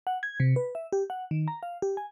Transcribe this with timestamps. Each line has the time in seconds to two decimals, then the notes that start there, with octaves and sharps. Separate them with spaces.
0.07 F#5
0.23 G#6
0.40 C3
0.56 B4
0.75 E5
0.93 G4
1.10 F#5
1.31 D#3
1.48 A#5
1.63 F5
1.82 G4
1.97 G#5